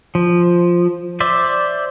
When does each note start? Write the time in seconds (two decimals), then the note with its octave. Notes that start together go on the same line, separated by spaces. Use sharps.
0.15 F3
1.20 C5 D5 E5